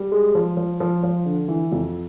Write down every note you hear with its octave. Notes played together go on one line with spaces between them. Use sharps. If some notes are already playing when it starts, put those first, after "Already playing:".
Already playing: G3
G#3
F3
F3
F3
F3
D3
E3
F2